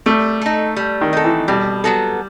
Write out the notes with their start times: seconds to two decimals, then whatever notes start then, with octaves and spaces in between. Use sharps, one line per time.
0.06 G3 A3
0.41 D#4 A4
0.76 G3
1.01 D#3
1.13 D#4 A4
1.24 E3
1.48 B2 G3
1.84 F#3 B3 F#4 A4